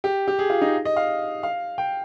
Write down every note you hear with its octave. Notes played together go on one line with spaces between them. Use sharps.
G4
G4
G#4
F4
D#4
D#5
F5
F5
G5